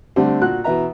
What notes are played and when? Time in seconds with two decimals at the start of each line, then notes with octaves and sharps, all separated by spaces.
0.16 D3 G3 A3 C4 D4
0.41 A#2 F#4 F#6
0.64 B2 E3 B4 E5 A#5